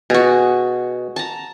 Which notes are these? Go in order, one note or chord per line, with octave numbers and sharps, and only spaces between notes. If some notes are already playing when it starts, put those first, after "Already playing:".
B2 F#4 G#4
A5 A#5